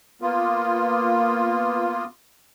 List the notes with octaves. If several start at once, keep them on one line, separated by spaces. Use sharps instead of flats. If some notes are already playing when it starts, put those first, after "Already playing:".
A#3 B3 F4